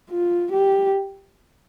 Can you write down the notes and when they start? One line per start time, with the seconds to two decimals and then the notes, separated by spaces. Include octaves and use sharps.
0.11 F4
0.52 G4